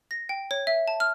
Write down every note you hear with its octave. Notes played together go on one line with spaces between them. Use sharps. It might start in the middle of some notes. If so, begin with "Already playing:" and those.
A#6
G5
C#5
E5
A5
F6